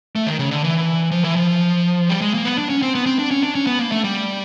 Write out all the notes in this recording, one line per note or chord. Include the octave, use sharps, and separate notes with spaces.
A3
D#3
C#3
D3
E3
F3
E3
F3
G3
G#3
A#3
B3
D4
C#4
C4
B3
C4
D4
C#4
D4
C#4
B3
A#3
A3
G3